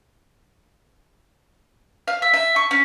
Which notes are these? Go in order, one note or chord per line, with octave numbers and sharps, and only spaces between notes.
F5
E5
E5
C#6
C#4